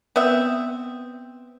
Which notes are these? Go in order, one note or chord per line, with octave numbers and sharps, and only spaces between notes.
B3 C4 E5